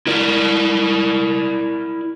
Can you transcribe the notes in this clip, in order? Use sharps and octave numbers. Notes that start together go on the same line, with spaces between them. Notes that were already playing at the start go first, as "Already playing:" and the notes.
E4 A#4 D5